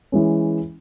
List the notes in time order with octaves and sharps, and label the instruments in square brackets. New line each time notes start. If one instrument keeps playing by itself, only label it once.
[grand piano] E3 G#3 C#4